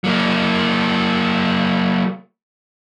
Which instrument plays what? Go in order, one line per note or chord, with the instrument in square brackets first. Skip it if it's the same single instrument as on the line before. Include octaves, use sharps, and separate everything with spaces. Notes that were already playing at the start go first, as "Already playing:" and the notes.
[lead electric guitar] F#3 A#3